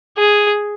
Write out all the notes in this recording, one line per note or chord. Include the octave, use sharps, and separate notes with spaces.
G#4